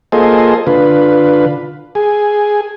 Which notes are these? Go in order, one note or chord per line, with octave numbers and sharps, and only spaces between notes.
A#3 F4 G#4 A4 C5 D#5
D3 F4 B4
G#4